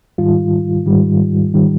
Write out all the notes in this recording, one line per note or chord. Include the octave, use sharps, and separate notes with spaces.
G#2 D#3 G3 F4
G#2 D#3 G3
D#3 G3